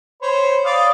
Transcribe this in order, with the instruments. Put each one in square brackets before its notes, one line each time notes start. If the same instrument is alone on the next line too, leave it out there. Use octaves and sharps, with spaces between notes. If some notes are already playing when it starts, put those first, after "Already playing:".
[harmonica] C5 C#5 B5
D5 F5 D#6